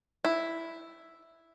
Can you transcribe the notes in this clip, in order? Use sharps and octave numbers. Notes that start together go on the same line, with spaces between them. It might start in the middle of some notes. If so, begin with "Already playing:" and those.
E4